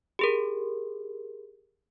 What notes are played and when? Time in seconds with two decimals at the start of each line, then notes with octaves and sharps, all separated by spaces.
0.19 G4 G#4 A#4